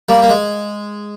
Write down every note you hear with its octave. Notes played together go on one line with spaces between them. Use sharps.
G3 A#3
A#3
G#3